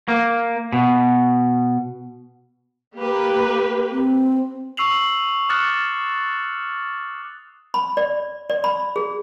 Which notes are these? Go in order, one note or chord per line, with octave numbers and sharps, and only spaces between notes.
A#3
B2
A#3 G4 B4
C4
C#6 E6 C7 F7 F#7
D6 D#6 F6 F#6 A6 C#7
B5
D5
D5
B5
G#4